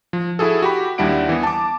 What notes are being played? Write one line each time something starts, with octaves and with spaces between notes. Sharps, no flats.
F3
E4 F#4 G#4 A4
F#4 G4 B5
D#2 G3 D4 E4 F#5 D7
E3 B3
A5 D6